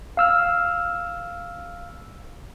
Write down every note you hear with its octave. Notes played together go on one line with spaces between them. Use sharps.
F5 E6 F6